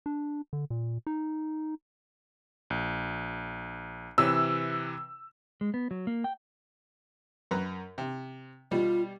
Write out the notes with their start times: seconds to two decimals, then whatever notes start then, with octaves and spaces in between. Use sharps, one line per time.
0.06 D4
0.53 D3
0.70 A#2
1.07 D#4
2.70 A#1
4.18 C3 E3 B4 E6
5.61 G#3
5.74 B3
5.91 F#3
6.07 A#3
6.24 G5
7.51 F#2 B4 A#5
7.98 C3
8.71 B2 G3 F4